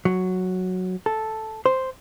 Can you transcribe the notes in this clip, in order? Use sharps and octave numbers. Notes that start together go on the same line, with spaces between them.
F#3
A4
C5